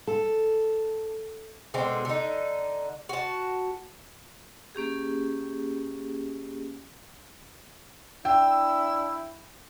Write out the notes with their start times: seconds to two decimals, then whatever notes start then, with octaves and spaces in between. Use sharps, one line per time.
0.07 A4
1.74 B2 D3 G#3 C4
2.05 D3 D#4
3.09 F#4 A5
4.75 A#3 C#4 G4 G#4
8.25 D4 E4 G5 E6